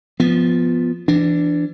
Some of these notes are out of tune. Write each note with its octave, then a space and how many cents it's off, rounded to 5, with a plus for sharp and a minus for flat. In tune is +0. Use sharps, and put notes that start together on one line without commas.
F3 +0 B3 +0
E3 +35 D4 +0